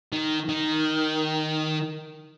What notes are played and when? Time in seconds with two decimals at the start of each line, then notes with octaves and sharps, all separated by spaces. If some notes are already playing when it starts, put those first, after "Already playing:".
0.13 D#3
0.49 D#3